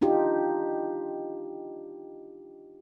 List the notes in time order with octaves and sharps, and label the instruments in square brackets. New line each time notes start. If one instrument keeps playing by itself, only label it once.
[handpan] D4 D#4 F4 G4